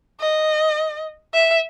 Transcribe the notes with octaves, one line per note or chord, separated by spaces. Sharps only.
D#5
E5